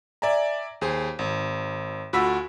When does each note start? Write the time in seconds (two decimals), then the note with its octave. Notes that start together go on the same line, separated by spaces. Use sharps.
0.22 D5 E5 G#5 A#5
0.81 D#2 G#4 C5
1.19 G#1
2.13 D2 F4 F#4 B5 E6 B6